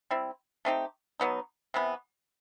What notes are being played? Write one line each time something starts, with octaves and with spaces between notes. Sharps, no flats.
G3 C4 E4
A3 C4 D#4 G4
B2 F#3 B3 D#4
C3 E3 B3